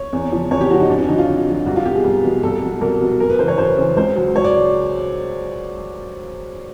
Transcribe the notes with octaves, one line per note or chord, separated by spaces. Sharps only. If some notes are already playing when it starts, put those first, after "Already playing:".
Already playing: C#5
E2
C#3 F3
E2 C#5
G4
C#3 F3 F#4
D#4
F2 D4
C#4
D3 F#3 D#4
F4
F2
D3 F#3
C2 F#4
F4
B2 F#3 G4
G#4
C2
B2 F#3
C2 A4
B2 F#3
C2 A#4
B2 F#3
F#2 A#4
B4
C#3 E3 C5
C#5
F#2 C5
C#3 E3
C#2 C5
C#3 F#3
C#2 C#5
D5